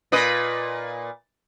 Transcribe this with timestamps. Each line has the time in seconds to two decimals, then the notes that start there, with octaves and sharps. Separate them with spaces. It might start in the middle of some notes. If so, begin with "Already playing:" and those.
0.12 A#2 B4 D#5